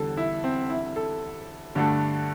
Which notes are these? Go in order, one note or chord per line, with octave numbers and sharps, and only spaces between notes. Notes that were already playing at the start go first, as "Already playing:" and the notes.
Already playing: E2 D3 G3 A4
E4
C4
E4
A4
G2 D3 A3 D4 A4